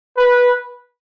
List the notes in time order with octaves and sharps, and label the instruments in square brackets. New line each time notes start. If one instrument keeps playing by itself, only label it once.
[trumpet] B4